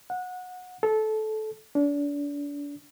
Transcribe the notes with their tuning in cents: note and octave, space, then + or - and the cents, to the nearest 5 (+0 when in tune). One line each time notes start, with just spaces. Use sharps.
F#5 -20
A4 -20
D4 -35